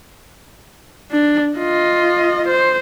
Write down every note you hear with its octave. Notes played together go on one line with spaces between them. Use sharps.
D4
F4 D#5
C5